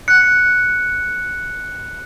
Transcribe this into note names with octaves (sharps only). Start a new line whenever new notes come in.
F#6 C#7